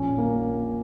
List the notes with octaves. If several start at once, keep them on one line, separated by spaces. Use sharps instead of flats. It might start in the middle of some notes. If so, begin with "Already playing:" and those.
Already playing: A#1 C#4
A#3